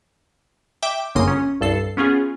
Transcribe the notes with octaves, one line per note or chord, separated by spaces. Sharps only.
E5 G5 D6
G1 F#2 C#3 A#3 C6 D#6
C#4
C2 G2 A4 C7
B3 C#4 F4 G#4